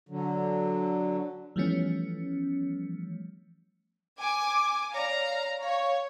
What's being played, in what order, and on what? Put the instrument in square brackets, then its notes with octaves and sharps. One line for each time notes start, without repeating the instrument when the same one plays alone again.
[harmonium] D3 F#3
[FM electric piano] E3 F3 G3 A3 B3 C#4
[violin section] G#5 D6
[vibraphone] C#5 D5 [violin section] F5 A#5
[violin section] C#5 [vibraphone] F5